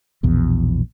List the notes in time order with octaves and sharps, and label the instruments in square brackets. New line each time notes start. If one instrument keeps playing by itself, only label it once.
[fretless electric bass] A#1 E2 B2